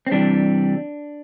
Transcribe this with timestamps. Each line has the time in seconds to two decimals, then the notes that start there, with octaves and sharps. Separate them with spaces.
0.07 C4
0.12 C2 C3 E3 G3 D4